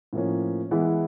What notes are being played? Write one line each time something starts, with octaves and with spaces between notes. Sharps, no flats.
A2 F3 A#3 C#4
E3 G#3 B3 E4